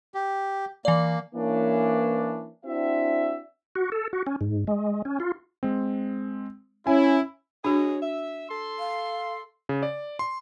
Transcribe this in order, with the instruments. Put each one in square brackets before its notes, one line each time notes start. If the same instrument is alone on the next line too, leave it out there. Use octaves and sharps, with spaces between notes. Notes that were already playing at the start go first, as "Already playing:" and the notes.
[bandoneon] G4
[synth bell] E3 D5 [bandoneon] A#3
[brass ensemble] E3 A#3 C#4 D4
C4 D4 E4 F#4 E5
[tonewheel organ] F#4
A4
F#4
C#4
G#2
G#3
C#4
F4
[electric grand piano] G#3 C4
[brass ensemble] C#4 E4 [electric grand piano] G#5
[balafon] D4 F#4 [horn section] G#4 C#5 D#5
[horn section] E5
A4 C6
[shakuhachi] F5
[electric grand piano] C#3
D5
C6